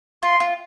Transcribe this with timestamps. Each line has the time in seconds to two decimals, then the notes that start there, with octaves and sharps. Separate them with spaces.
0.23 F4 C6
0.40 F4